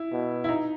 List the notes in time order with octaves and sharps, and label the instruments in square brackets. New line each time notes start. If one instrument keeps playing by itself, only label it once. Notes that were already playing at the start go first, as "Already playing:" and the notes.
Already playing: [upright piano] E4
[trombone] B2
[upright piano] E4
D#4